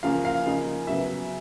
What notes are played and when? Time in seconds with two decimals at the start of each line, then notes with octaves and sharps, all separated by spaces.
0.03 C#3 F3 A#3 C#4 F5
0.25 F5
0.46 C#3 F3 A#3 D#4
0.87 C#3 F#3 B3 E5